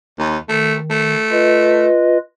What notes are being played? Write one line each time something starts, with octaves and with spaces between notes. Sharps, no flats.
D#2
D#3 A3
A3
F4 B4 D#5